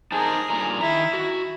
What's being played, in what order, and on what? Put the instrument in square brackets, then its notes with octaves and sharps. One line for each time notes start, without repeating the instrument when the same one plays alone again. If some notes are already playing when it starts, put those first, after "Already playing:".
[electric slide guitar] D#4 C5 A5 [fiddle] G#4 A#4
[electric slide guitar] G2 A#2 A#5
[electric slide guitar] D#3 A#5 [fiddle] E4
[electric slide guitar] F#4